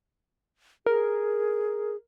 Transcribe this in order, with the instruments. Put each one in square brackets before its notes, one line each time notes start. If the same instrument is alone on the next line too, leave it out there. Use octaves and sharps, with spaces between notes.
[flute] G#4 [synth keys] A#4